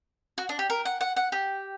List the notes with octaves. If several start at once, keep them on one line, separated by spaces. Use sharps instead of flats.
F#4
D4
G4
A#4
F#5
F#5
F#5
G4